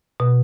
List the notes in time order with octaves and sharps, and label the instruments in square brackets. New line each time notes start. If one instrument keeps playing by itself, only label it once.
[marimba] B2